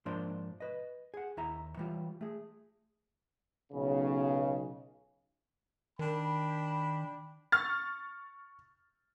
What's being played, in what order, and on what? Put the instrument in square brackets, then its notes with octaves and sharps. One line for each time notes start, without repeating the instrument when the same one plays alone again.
[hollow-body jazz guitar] G#2 F3 A#3 D4 C5 C6
B4 D#5
G#4 F#5
D#2 E4 E5 A#5
E3 G3 F4
A3 G#4
[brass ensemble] B1 C#3
[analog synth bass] D#3 [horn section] D4 G5 B5
[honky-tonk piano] C#6 F6 A6